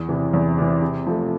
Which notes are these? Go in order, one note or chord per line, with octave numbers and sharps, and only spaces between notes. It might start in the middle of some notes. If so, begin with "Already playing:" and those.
Already playing: E2
C3 E3
E2
C3 E3
C3
F3 A3